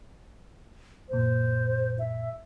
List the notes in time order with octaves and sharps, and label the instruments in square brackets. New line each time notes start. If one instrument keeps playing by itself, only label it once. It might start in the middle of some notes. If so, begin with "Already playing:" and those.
[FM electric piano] A#1 F#2 A#2 [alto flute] C5
[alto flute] E5